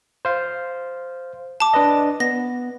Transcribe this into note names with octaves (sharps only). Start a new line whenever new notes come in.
C5 F5
A5 D6
D4 B4 D#5
B3 A#6